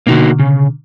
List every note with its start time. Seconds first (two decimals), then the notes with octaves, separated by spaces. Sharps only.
0.07 B2 D3 A#3 D#4 F#4
0.39 C#3